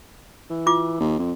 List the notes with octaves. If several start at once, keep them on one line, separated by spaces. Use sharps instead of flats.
E3
F4 D6
D#2
F2